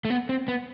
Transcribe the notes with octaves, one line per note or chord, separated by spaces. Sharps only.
A3
B3
C4
B3